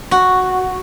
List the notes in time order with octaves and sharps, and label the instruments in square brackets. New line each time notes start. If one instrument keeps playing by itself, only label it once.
[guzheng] F#4